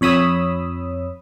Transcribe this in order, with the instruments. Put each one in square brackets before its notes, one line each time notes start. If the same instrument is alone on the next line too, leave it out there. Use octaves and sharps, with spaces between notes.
[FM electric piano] F2 C#5 B5 D#6 E6